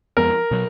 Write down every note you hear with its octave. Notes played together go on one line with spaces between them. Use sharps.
F2 F3 G#3 B3 A#4
B2 F#3